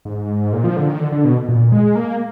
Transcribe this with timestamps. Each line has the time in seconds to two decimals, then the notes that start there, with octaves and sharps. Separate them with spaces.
0.05 G#2
0.53 A#2
0.64 F3
0.77 D3
0.89 D#3
1.00 D3
1.12 D3
1.25 B2
1.48 A#2
1.72 G#3
1.96 A#3